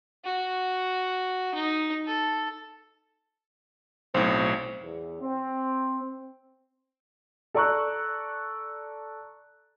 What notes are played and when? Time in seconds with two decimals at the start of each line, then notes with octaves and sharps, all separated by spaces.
0.24 F#4
1.55 D#4
2.07 A4
4.14 B1 A2 C4
4.81 E2
5.20 C4
7.54 A4 D5 A#5 C#6 E6 F#6